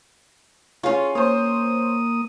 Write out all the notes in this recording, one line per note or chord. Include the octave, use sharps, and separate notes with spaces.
C#4 F4 G#4 C#5 F5
A#3 C5 C#5 D#6